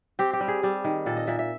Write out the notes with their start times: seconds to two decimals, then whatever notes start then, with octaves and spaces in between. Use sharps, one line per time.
0.19 C4 G4
0.33 G4
0.40 G3
0.48 G#4
0.63 G3
0.84 D#3
1.06 A#2 A4
1.17 D#5
1.27 A#2 E5
1.39 E5